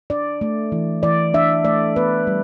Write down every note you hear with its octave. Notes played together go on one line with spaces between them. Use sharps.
D4 D5
A3
E3
E3 D5
D4 E5
A3 D5
B3 B4
G3